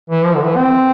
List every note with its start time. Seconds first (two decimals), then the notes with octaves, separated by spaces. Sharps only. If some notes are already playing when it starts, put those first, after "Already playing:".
0.10 E3
0.25 F3
0.36 D3
0.45 E3
0.56 C4